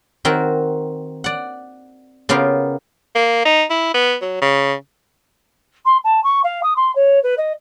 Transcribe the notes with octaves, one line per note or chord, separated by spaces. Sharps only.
D#3 C4 F#4 A#4
D5 F#5
C#3 B3 F4 G4 A#4
A#3
D#4
E4
B3
F#3
C#3
C6
A5
C#6
F5
D#6
C6
C#5
B4
D#5